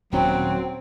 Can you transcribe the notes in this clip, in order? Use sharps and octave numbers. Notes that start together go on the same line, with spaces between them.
D#1 F#3 C4 C#4 G5